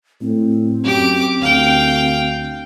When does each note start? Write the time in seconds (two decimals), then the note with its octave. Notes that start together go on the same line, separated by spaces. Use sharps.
0.21 A2 C4
0.84 F#2 G4 D6
1.41 D2 F5 G5